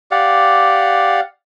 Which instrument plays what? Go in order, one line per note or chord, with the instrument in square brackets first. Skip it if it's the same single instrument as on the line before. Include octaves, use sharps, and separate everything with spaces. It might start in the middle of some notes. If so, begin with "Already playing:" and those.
[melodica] G4 D5 F5 F#5